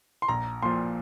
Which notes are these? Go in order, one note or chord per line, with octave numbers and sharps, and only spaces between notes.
C6
A#1 A#5
A#2 F3 C6